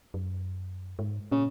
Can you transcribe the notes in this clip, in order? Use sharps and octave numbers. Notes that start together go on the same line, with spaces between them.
F#2
G#2
A#2 C#3